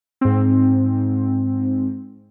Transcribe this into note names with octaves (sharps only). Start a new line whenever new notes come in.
G#2 C4